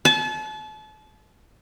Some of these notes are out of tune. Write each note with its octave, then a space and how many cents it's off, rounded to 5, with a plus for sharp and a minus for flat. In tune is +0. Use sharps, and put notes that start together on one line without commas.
A5 -35